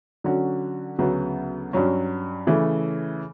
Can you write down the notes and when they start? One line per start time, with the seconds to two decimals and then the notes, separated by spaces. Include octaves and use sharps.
0.24 D3 F#3 C#4 F#4
0.99 D2 C#3 F#3 B3
1.73 G2 F#3 C#4
2.47 C#3 E3 A3